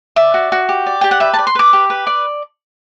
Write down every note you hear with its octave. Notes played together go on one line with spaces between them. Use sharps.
D5 E5
F#4
F#4
G4
D5
G4 G5
F#5
B4 E5
A5
D5
C6
B4 D6
G4
B4
D5